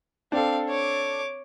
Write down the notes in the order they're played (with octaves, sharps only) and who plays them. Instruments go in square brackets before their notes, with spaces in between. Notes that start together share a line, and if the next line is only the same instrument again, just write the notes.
[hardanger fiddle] C4 F5 [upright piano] D4 A4
[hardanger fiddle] C#5 D6